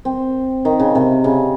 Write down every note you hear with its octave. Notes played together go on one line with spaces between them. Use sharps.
C4
D#3
C#3
C3
C#3